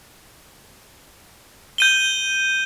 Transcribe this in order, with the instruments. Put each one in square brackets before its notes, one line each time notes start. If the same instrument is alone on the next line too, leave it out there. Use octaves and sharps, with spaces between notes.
[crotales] G6 D#7 G7